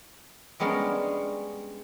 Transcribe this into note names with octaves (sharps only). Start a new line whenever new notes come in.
G3 G#3 B3 C#4 D4 A#4